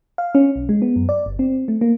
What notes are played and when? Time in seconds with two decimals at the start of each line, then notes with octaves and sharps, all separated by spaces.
0.18 F5
0.35 C#4
0.56 B1
0.69 G#3
0.82 B3
0.96 F#2
1.09 D5
1.26 G1
1.39 C4
1.68 A3
1.81 A#3